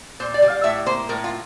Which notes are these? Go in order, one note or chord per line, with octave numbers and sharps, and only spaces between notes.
A#2 C5
D5
G3
F5
A2 E5
A#3 C5
A2 A#4
F4